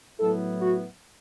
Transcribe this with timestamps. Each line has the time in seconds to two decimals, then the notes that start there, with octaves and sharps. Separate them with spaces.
0.20 A2 F#3 B3 E4 A4
0.61 F#4